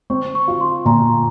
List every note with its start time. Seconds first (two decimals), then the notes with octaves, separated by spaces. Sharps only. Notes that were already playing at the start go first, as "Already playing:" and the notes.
0.10 C4 C#6
0.35 C#6
0.48 F4
0.60 C6
0.85 A#2 A#5